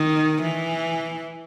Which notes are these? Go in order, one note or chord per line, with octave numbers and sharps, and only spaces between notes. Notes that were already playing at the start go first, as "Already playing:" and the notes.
Already playing: D#3
E3